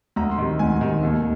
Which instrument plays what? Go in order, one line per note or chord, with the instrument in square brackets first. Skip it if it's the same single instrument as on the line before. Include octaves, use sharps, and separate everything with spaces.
[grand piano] D2 A#5
C6
C3 D#3
D2 G#5
C3 D#3
D#2